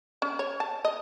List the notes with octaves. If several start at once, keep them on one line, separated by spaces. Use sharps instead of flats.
C#4
C#5
A5
D#5